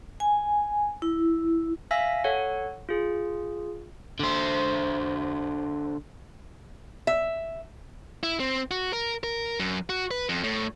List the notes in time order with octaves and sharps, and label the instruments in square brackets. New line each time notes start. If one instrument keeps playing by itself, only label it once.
[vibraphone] G#5
E4
[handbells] E5 F5 G#5 E6 A#6 B6
A4 C#5 F#5
F4 G#4
[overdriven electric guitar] D3 C5
[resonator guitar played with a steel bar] E5
[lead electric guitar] E4
C4
F#4
A#4
A#4
F#2
F#4
B4
F2
A2